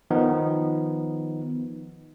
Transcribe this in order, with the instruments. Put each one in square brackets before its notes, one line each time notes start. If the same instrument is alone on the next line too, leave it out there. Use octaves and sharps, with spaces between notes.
[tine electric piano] D#3 F3 B3 D#4